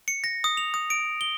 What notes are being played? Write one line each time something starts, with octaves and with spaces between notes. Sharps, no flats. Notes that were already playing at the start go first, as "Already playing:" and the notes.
C#7
A#6
D#6
F7
D#6
D7
G7